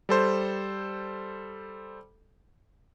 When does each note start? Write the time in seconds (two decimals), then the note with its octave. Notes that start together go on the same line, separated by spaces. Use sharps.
0.09 G3 A4 C5